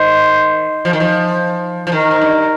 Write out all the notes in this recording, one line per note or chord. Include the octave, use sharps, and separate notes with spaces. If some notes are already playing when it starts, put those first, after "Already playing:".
Already playing: D#3 C5
F3
D#3
F3
F3
D#3 A#4
G#2
G2